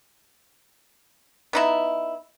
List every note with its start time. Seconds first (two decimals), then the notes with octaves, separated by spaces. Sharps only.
1.53 B3 D#4 E4